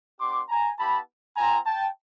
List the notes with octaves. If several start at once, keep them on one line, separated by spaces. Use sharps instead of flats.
B3 D4 G4 C6 D6
G#5 A#5
B3 E4 G4 A5 B5
C4 F4 G#5 A#5
G5 A5